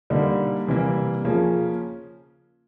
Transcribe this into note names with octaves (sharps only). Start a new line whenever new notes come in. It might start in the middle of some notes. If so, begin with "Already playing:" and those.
D3 G3 A#3 D#4
C3 E3 G3 A#3
C#3 F3 A#3 C#4